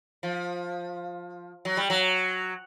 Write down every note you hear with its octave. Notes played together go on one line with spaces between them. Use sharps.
F3
F#3
G3
F#3